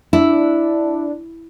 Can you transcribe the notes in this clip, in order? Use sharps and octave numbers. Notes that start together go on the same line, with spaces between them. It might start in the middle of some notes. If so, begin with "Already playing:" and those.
D4 E4